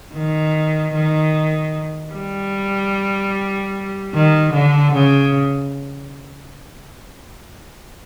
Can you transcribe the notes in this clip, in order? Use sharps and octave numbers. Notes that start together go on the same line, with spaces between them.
D#3
D#3
G3
D#3
D3
C#3